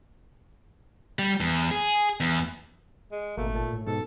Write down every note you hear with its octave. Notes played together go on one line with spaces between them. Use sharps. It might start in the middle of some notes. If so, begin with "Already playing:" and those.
G3
E2
G#4
E2
G#3
G#1 B2 A3 A#3
A#2 A5
A2
G#2 B2 A4